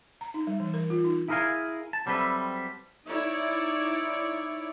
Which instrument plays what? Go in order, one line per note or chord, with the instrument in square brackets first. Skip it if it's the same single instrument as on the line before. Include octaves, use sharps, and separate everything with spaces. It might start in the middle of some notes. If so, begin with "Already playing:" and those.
[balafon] A#5
D#4
G3
E3
A#4
F4
D#4
[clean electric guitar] E4 G#4 A#4 C5 F5 G#5
A5
F#3 G3 C4 A4 B4 E5
[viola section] D#4 E4 C#5 D5